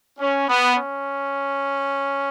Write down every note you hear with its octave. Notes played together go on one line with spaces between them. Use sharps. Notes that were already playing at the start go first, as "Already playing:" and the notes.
C#4
B3
C#4